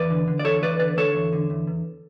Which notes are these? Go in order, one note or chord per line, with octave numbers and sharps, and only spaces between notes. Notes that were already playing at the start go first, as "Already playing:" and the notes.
Already playing: E2 B4 D5
D3
D3
D5
E2 A4 C#5
E2 B4 D5
D3 B4 D5
D3 A4 C#5
E2
D3
E2
E2